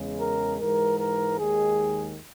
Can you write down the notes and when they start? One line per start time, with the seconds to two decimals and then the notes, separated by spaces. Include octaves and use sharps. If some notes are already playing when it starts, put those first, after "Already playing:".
Already playing: E2 C#3 G#3
0.20 A#4
0.60 G#2 E3 G#3 A#4
0.99 A#4
1.39 D#2 D#3 G#3 G#4